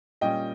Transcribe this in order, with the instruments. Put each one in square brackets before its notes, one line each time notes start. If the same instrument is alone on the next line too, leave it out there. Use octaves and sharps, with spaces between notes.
[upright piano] A#2 G3 C#4 D#5 G5